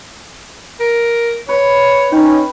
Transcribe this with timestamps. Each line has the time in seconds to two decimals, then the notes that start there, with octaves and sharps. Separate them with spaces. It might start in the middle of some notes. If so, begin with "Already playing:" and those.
0.80 A#4
1.49 B4 C#5
2.12 C#4 D#4 G5 B5